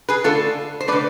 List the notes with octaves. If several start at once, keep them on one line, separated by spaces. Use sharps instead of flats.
G#4 B4
D3 A3 F4 A4
C5
D3 A3 B4 D5